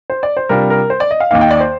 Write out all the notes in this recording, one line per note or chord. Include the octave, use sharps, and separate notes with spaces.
C5
D5
C5
C3 G3 D4 F4 A#4
A#4
C5
D5
D#5
F5
D#2 D#3 A#3 D#4 F5
G5
D5
C5